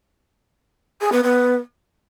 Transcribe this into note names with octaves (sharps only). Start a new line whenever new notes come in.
G#4
B3
B3